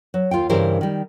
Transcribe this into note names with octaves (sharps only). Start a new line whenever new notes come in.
F#3
D#2 F4 F5 G5
G2 C#3 E3 G4 A#4 C5
D#3 G3